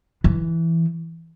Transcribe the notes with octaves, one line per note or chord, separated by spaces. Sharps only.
E3